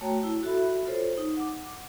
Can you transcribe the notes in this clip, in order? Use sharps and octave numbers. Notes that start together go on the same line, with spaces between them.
A3 F#4 C#5 G5 A5 A#5
E4
F#4 A4 E5 B5
F4 A4 C5 C#5
D#4
F#5 D6